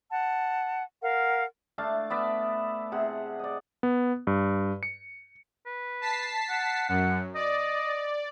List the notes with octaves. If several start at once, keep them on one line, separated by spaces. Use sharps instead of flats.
F#5 A5
A#4 F5 F#5
A3 D4 F5 A5
B3 D5 E5
C3 G#4 F#5
D5 D#5
B3
G2
C#7
B4
A5 B6 C7
F#5
F#2 F#5
D5 D#5